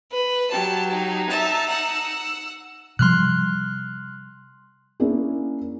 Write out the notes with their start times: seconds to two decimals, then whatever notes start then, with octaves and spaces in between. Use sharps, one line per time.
0.12 B4
0.51 F#3 G4 A5
0.92 D#4
1.29 E5 A5
1.69 F#5 E6
2.99 C3 F3 G3 C6 F6 F#6
5.00 A#3 C#4 D4 E4 G#4